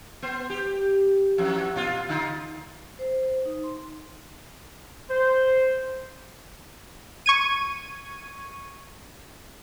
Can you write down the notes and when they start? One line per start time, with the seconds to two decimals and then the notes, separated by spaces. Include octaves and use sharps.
0.22 B3 C5
0.50 G4
1.38 F2 E3 F#3
1.76 A#2 F4
2.09 D3 D#4 F4
2.99 C5
3.45 D#4
3.64 C6
5.10 C5
7.26 C#6 G#6 D#7